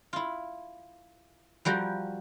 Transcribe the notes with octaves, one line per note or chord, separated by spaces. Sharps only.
E4 F4
F3 G3 F#4 A#4